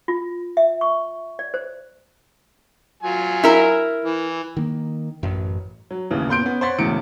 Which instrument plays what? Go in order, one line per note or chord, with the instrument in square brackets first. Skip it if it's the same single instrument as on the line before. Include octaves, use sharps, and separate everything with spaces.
[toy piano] F4
E5
C#6
D5
C5
[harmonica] F#3 F4 G#5
[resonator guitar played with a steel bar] E4 A#4
[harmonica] E3
[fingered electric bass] D#3 A#3
A1 F#2
[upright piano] F#3
A1 D#2 C#3 E3
A#2 B3 C6 G6 D7
B3 C#4
C5 C#5 F#5 C6 A6 B6
E1 E2 A2 C#3 C#7 D7